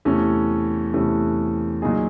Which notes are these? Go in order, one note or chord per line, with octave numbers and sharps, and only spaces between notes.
E2 C3 E3 A3 C#4
E2 C3 E3 A3 C#4
A#2 F#3 A#3 D#4 G#4